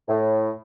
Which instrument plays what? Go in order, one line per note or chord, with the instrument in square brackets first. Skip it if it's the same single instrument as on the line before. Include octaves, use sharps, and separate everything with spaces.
[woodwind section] A2